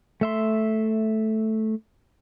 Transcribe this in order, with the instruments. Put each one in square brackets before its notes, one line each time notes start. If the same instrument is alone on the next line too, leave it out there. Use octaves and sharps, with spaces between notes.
[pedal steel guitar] A3 E5 C6